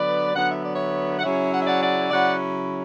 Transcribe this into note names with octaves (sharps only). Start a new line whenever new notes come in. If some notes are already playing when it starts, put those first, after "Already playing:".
Already playing: D3 F#3 B3 B4 D5
D3 F#3 B3 F#5
E5
D5
C#5 E5
F#5
C#3 F#3 C#4 E4 C#5 E5
F#5
E5
D5 F#5
D5 F#5
C#3 F#3 C#4 E4 D5 F#5